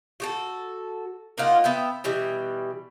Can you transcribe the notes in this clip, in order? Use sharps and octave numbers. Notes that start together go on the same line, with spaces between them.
F#4 G4 A4
A#3 D#4 F4 F#5
B3 E5 G5
B2 E3 G3